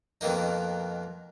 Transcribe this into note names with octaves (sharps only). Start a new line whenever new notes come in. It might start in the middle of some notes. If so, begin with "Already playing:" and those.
F2 B2 D#3 A#3 D#4